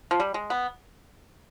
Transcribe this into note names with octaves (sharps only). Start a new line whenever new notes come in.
F3
G3
G#3
B3